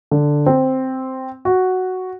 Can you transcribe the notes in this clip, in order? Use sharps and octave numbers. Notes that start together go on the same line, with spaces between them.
D3
C4
F#4